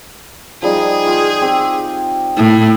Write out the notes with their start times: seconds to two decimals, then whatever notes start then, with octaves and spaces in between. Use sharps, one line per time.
0.62 F3 G3 D#4 G#4
1.06 F4 G5
1.42 C4 G4
2.37 A2